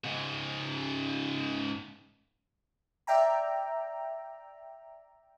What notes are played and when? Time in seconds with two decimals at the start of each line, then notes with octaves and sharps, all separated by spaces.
0.04 G#2 C#3
3.07 D5 E5 G5 A#5